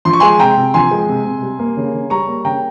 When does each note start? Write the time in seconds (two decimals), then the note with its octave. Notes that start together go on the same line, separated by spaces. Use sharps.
0.05 F3 C6
0.13 C#6
0.20 G#3 G#5 C6
0.39 C3 G5 A#5
0.57 C3
0.74 F3 G#5 C6
0.91 G#3
1.09 C3
1.25 C3
1.43 G3
1.59 A#3
1.77 C#3
1.94 C#3
2.10 G3 A#5 C#6
2.28 A#3
2.45 C#3 G5 A#5